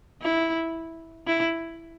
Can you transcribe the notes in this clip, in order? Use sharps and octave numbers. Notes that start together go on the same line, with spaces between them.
E4
E4